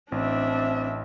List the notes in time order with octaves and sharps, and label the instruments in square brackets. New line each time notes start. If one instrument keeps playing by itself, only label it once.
[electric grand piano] A1 [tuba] C4 [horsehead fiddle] D4 E5